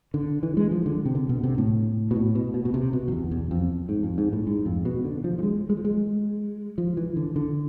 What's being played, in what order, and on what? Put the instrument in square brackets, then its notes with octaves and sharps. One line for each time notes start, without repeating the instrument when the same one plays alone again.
[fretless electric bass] D3
E3
G#3
F3
D3
C3
D3
B2
C3
A2
B2
A2
B2
B2
B2
C3
B2
F2
E2
E2
F2
G#2
F2
G#2
A2
G#2
F2
B2
D3
F3
F3
G#3
G#3
F3
G#3
F3
E3
D3
D3